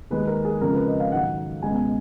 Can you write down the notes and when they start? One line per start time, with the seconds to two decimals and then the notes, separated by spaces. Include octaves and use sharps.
0.10 D#2 D#3 G#3 B4
0.27 A#4
0.45 G#4
0.61 F2 C#3 F3 G#3 A#4
0.74 B4
0.87 D#5
1.00 F5
1.12 G#2 D#3 F#3 F#5
1.62 C#2 B2 G#3 G#5
1.76 G#5